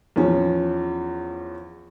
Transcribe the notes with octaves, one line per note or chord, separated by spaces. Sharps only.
E2 F3 C#4